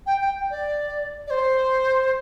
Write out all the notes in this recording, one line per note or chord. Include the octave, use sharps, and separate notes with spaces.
G5
G5
D5
D5
C5